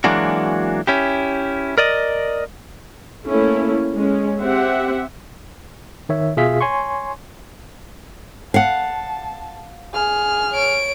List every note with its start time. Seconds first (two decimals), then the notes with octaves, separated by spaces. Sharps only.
0.04 E3 F#3 G#3 A#3 D4 F#4
0.87 C#4 E4 G4
1.78 A#4 D5 D#5
3.27 A3 A#3 C#4 E4
3.94 G#3 C#4
4.41 C4 G4 E5 F#5
6.09 D#3 C#5 E5
6.37 B2 F4 G#4 E5 F5 B6
6.61 C#5 G#5 C6 C#6
8.54 F5 F#5 A5
9.93 G#4 F6
10.53 C#5 D7